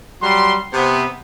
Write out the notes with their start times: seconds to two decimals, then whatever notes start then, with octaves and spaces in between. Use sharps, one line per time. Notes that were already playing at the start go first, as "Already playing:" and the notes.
0.22 F#3 G3 C6
0.73 C3 B3